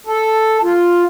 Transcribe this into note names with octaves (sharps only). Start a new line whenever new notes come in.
A4
F4